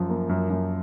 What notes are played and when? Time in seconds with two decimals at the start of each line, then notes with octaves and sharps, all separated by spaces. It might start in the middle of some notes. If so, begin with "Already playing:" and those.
Already playing: F#2 F3
0.10 A#3
0.29 F#2
0.50 F#2